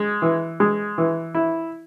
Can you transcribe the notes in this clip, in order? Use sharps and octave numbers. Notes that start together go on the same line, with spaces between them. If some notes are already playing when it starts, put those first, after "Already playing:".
Already playing: G#3
E3
G#3
E3
E4